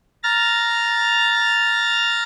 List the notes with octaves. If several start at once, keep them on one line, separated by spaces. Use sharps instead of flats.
A#5 F6 A6